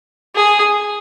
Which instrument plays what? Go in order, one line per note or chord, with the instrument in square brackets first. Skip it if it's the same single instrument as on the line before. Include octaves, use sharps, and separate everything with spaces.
[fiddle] G#4